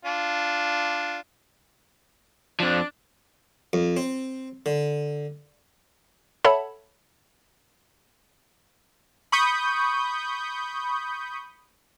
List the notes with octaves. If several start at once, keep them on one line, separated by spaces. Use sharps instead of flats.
D4 F4
F3 C4 D4
F2
C4
D3
A4 C#5 E5 F#5 A5 B5
B5 C#6 D#6 G6